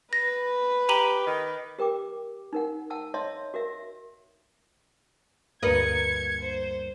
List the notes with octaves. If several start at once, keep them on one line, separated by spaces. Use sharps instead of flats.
B4 A#6
G4 A#5 D#7 F#7
D#3
G4 A#4 G5 D6
D#4 A#4 F#5
F#5 A5 E6
C#5 D#5 E5 F#5 A5 C6
F#4 A#4 E5
D2 G2 A#3 A#4 B4 D#5 G#6 C#7
C5